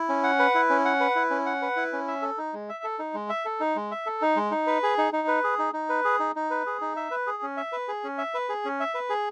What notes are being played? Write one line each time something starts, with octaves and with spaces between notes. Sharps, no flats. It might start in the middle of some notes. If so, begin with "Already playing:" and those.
Already playing: E4
C#4
F#5
B4
E4
C#4
F#5
B4
E4
C#4
F#5
B4
E4
C#4
E5
A4
D#4
G#3
E5
A4
D#4
G#3
E5
A4
D#4
G#3
E5
A4
D#4
G#3
D#4
B4
G#4
D#4
D#4
B4
G#4
D#4
D#4
B4
G#4
D#4
D#4
B4
G#4
D#4
E5
B4
G#4
C#4
E5
B4
G#4
C#4
E5
B4
G#4
C#4
E5
B4
G#4